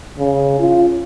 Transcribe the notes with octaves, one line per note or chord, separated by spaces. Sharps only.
C#3
F4